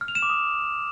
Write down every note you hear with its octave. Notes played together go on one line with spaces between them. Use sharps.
F6
F7
E7
D6
D#6